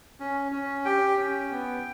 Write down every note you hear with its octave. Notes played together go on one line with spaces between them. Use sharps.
C#4
C#4
G4 G5
C#4
B3